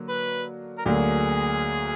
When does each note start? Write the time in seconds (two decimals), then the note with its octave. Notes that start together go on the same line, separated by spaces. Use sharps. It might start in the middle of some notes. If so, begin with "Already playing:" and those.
Already playing: D3 F#3 A#3
0.09 B4
0.78 A#4
0.86 D2 D3 F#3 A#3 G#4